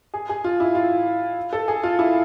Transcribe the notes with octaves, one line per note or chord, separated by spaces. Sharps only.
G#4
G#4
F4
E4
F4
A4
G#4
F4
E4